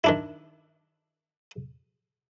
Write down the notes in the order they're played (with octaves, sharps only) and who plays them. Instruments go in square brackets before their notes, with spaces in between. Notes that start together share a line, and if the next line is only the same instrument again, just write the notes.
[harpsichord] D#3 D4 E4